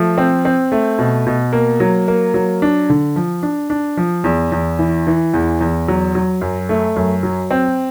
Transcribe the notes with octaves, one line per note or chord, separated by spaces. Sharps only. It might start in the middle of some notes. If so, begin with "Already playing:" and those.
Already playing: F3 A3
C4
C4
A3
B2
B2
A#3
F#3
A#3
F#3
D4
D3
F3
D4
D4
F3
E2
E2
E3
E3
E2
E2
F#3
F#3
F#2
A3
F#2
F#3
C4